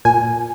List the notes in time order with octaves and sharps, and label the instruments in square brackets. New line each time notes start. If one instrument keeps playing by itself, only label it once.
[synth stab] A#2 G#5